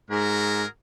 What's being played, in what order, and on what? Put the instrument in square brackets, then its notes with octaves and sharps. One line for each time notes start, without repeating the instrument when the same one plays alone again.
[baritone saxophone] G#2 [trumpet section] F#4 G#4 A#4